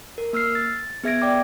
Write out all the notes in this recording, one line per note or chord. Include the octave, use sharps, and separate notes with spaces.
A#4
A#3 E6 F6 C7
A6
B3 G#4 E5 G#6 A#6 D7
D5 G5 D6